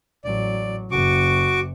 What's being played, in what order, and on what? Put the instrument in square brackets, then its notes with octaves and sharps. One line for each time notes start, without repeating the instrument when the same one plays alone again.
[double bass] A1 F#3 [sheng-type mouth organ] D5
[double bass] F#1 [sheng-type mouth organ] F#4 C#6 D6